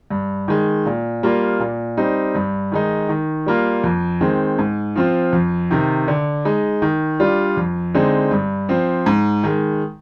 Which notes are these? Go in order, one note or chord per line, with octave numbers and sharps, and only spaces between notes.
G2
D#3 G#3
A#2
G3 A#3 F4
A#2
G3 C4 D#4
G2
D#3 G#3 D#4
D#3
G3 A#3 F4
F2
D#3 G#3 C4
G#2
F3 C4 F4
F2
C3 D#3
D3
G#3 D#4
D#3
G3 D4 F4
F2
D3 G#3 C4 D#4
G2
F3 C4
G#2
D#3 G#3